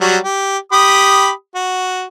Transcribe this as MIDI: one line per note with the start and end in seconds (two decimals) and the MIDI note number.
0.01 0.17 54
0.01 0.17 55
0.01 0.17 66
0.23 0.57 67
0.72 1.30 67
0.72 1.30 83
0.72 1.30 87
1.55 2.04 66